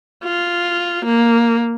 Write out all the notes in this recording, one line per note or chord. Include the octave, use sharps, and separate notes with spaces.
F4
A#3